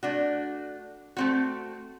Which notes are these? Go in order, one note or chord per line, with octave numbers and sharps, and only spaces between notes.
A3 D4 F#4
A3 C4 F#4